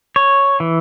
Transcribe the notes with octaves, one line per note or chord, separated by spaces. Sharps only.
C#5
E3